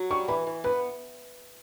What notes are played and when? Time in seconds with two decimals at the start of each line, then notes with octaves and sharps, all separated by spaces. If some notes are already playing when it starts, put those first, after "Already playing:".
Already playing: F#3
0.11 G3 C#6
0.28 E3 B5
0.47 E3
0.64 B3 B4